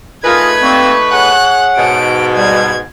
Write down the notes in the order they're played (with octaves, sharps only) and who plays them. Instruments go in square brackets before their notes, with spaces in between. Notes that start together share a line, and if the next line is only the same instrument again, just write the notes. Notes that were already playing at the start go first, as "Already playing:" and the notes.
[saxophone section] A3 D#4 B4 [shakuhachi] F4 [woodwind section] G#4 A#4 [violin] G#6
[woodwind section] G2 A#3 C4 [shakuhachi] C#6
[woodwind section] G#4 C#5 F#5 [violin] F#6
[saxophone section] G#2 B2 [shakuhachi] A5 [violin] D7
[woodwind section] G3 [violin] G#6